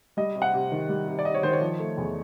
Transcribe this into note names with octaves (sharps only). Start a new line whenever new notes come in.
G3 D#5
C3
F#5
C3
D#3
G3
C3
D5
C3 D#5
C#5
D#3 C5
C#5
F3
A3
E2